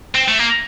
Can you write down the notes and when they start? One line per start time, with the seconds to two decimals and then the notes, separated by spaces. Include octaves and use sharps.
0.15 C4
0.28 A3
0.39 A#3